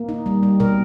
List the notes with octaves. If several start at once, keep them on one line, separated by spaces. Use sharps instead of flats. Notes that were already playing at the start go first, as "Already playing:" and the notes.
Already playing: A#3
D#4
G3
G3
B2 A#4